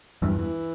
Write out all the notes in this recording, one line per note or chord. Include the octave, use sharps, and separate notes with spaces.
E2 G2 E3
E3